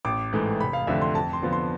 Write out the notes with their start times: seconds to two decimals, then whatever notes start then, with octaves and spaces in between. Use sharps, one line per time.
0.05 A1 D6
0.33 G#2 E3 A3
0.60 F1 B5
0.73 F5
0.87 F2 D3 F3 A3 E5
1.02 C6
1.15 F2 A5
1.33 C6
1.42 D3 F3 B3
1.53 C6